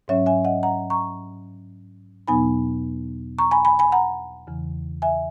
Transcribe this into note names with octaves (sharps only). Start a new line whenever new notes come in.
G#2 F#3 C#4 C#5 E5
E5 G#5
D#5 F#5
F#5 A#5
A#5 C#6
E2 B2 F#3 B3 D#4 G#5 B5
A#5 C#6
G#5 B5
G#5 B5
G#5 B5
F#5 A#5
E2 C#3 E3
E5 G#5